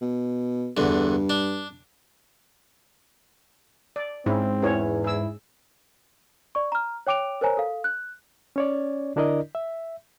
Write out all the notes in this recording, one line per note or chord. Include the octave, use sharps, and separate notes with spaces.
B2
E2 G2 D3
D4
D5
G#2 C4 C#4 E4
E2 C#4 C#5
E4 G#4 E6
D5 C#6
A#5 F6
C#5 G5 D6 D7 F7
A#4 C5 C#5 G#5 A#5
A4 F5
F#6
C#4 C#5 D5
D3 D4 E4 A#4 D5 D#5
E5